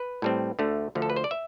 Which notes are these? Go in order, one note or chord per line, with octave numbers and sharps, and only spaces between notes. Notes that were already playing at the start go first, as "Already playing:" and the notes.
Already playing: B4
A2 G3 C4
D2 D3 A3
D2 D3 F3
A4
B4
C5
D5
E5